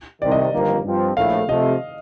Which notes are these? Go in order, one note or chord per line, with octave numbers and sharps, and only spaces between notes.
C2 C3 D#3 D5
D#5
G1 F2 D#3 A#3
G2 F3 C4
A#1 A2 A3 F5
C3 F3 A3 D#5